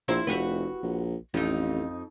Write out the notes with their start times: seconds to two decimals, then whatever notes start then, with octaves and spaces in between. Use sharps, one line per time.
0.08 A#1 E4 A#4 C5
0.27 F1 F#4 G4 B4
0.83 A#1
1.34 A1 F2 D#4